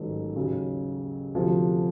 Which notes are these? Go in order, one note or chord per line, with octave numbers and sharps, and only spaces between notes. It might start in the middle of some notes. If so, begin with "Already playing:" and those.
Already playing: A1 G#2 D#3 F#3 A3
D#2 C#3 F#3
D2 C3 F3 A3